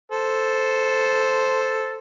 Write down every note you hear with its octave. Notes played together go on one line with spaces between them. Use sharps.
A4 C5